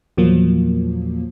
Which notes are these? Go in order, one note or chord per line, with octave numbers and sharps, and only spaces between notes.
E2 A#2 F3 F#3 A#3